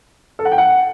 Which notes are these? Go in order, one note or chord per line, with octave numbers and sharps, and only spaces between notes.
A4
F#5
G5
F#5